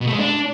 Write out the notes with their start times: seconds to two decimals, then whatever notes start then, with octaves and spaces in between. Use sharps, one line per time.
0.01 B2
0.07 A3
0.13 G#3
0.19 D4